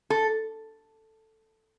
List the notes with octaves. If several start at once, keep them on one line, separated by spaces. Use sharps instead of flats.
A4